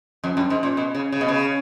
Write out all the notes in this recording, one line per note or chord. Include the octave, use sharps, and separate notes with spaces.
F2
F#2
G#2
A#2
B2
C#3
C#3
B2
C#3